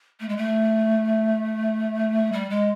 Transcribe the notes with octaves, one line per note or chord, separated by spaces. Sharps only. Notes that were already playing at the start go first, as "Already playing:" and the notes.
A3
G#3
A3
G3
G#3